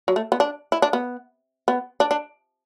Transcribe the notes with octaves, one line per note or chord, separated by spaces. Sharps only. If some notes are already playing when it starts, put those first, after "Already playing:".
F#3
A3
B3
D4
E4
D4
B3
B3
D4
D4